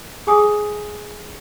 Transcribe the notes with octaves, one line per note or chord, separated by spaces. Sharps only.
G#4 G#5 D#6